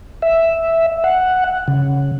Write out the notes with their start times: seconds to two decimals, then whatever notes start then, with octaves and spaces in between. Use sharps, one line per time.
0.22 E5
1.04 F#5
1.68 C#3